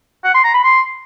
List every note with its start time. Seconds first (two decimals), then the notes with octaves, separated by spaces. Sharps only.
0.24 F#5
0.34 C6
0.44 A#5
0.54 B5
0.63 C6